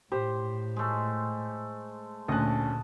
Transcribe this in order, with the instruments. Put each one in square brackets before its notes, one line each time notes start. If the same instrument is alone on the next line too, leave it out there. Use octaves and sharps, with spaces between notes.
[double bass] A2 [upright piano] G4 [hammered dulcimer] C5
[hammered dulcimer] G#3 A3
[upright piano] D2 C#4 F#6 [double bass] A#2 D3 [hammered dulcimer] D#5 A5